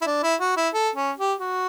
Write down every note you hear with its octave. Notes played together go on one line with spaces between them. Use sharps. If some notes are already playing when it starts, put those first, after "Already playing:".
E4
D4
E4
F#4
E4
A4
C#4
G4
F#4